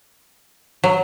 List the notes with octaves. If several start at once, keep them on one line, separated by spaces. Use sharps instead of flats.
F#3